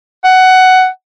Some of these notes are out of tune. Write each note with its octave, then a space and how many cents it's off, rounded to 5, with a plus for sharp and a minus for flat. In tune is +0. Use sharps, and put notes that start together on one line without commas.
F#5 +10